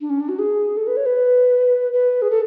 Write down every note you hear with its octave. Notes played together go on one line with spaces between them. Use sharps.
D4
C#4
D4
F#4
G#4
A4
B4
C#5
B4
B4
G#4
A4